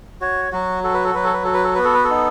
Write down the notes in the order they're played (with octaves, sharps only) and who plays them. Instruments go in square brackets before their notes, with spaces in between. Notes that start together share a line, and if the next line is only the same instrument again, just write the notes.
[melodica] F#4 C#5
F#3 F#4
F#4 A4
B4
A4
F#3 B4
A4
B4
F#4 A4
B4
A4
B3 B4
A4
B4
A4
D#4